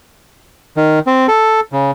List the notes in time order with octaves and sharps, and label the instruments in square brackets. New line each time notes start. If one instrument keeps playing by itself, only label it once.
[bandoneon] D#3
C4
A4
C#3